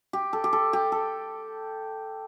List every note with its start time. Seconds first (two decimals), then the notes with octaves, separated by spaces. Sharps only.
0.13 G4
0.33 A4
0.44 G4
0.53 A4
0.73 G4
0.92 A4